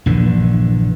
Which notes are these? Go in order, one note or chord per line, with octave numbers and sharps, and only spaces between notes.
A#1 G2 D3 E3